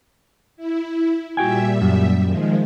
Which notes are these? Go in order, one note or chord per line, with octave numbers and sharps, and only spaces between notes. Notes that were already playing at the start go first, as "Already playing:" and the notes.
E4
A#2 G3 F#4 E5 G5 G#5
F#2
D#3 F3 G#3